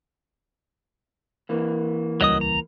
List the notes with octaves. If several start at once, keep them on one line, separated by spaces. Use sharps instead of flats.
E3 A#3
D#1 C#2 F#3 G3 D#5 D#6
A#5